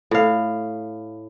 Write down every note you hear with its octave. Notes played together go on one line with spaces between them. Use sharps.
A2 F5